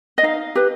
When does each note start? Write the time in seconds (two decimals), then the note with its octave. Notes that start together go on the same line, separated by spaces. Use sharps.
0.18 D#5
0.23 D#4 F5
0.55 G4 B4